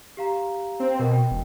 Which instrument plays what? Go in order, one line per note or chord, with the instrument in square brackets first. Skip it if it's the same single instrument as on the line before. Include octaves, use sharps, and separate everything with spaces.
[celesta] G4 F5 A#5
[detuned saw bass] C4
[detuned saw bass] B2 [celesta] A#4
[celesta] G5
[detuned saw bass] E1